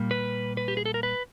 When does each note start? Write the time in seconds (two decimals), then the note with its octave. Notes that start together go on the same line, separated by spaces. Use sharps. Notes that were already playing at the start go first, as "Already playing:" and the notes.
Already playing: A#2 G3 A#3
0.11 B4
0.57 B4
0.68 G4
0.77 G#4
0.86 A4
0.94 A#4
1.03 B4